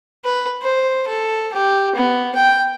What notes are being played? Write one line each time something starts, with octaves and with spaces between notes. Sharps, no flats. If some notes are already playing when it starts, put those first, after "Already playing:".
B4
C5
A4
G4
B3
G5